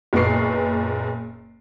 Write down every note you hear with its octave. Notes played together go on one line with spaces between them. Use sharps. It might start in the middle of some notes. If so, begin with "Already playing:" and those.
F#1 A#2 B3 B4 C#6 C7